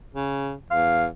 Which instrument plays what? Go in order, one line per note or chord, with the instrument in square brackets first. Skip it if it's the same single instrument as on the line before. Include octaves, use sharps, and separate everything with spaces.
[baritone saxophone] C#3
[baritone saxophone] E2 [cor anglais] F5